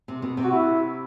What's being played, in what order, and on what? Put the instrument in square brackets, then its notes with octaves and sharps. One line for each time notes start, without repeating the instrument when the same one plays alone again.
[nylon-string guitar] C3
B2
C3
[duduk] F#4
E4